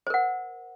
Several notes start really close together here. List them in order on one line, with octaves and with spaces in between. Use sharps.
C5 A#4 F#5